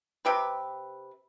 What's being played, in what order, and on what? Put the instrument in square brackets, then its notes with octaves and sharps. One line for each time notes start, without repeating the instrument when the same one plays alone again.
[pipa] C3 G4 B4